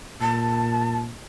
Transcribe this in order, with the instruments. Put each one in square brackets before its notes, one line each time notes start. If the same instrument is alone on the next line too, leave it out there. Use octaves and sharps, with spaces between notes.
[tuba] A#2 [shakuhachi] A5